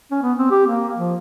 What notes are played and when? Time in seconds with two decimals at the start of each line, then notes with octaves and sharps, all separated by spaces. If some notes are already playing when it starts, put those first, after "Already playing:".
0.11 C#4
0.23 B3
0.38 C4
0.51 G4
0.67 A#3
0.97 F3